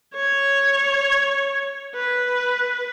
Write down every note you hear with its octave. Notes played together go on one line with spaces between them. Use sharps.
C#5
B4